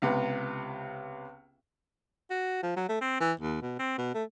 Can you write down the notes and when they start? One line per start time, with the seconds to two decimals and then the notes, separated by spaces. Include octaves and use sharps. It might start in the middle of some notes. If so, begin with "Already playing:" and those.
0.02 C#2 C3 B3
2.30 F#4
2.63 F3
2.76 F#3
2.89 A3
3.01 C4
3.20 E3
3.40 D#2
3.62 B2
3.79 C4
3.98 B2
4.15 A3